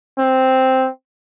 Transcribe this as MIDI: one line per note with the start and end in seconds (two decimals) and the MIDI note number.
0.19 0.89 60